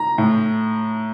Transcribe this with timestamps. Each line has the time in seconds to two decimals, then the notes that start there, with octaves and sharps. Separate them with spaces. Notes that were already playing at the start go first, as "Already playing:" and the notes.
Already playing: A#5
0.18 A2